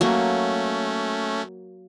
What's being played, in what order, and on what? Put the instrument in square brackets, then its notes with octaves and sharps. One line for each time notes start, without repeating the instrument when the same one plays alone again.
[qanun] F#3 A#3 [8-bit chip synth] A3 C#4